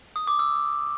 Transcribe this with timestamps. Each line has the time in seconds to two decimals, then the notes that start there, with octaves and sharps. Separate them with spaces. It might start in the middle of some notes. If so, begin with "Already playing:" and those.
0.16 D#6
0.27 D6
0.39 E6